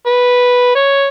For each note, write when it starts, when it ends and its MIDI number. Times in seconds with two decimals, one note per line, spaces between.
0.06 0.72 71
0.75 1.08 73